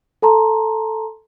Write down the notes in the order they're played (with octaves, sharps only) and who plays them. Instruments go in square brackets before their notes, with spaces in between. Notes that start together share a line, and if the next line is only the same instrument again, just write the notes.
[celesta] A4 A5 A#5 C6